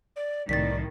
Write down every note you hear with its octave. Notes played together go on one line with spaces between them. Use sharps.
D5
C2 A2 D#3 D5 A6 B6